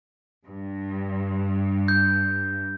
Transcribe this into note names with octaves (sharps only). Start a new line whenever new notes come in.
G2
G6